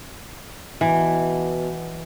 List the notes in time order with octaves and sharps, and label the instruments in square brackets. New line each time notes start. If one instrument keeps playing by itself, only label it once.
[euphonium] B2 [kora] E3